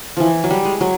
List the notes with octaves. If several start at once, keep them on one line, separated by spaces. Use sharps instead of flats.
E3 F3
F#3
G3
G#3
F#3